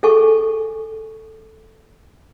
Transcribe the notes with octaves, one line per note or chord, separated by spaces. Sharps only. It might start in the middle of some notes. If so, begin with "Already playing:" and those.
G#4 A4 G#5 C#6